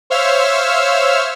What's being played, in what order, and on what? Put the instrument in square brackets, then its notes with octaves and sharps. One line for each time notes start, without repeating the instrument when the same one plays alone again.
[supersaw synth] C5 C#5 E5 F5 E6 F6